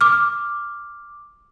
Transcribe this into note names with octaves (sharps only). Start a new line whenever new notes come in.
D6 F6